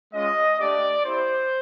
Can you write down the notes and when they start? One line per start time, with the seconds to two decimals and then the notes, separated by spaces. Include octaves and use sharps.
0.13 G#3 C#4 F4 D#5
0.59 A3 D4 G4 D5
1.05 C4 E4 G4 C5